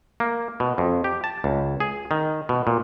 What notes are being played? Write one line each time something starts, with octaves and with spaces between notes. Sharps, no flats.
A#3
B2
F2
G4
A5
C#2
G#4
D#3
B2
A#2